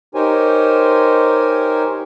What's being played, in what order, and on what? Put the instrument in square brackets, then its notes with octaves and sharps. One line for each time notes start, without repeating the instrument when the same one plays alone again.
[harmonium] D#4 G4 A#4 C5 C#5 G#5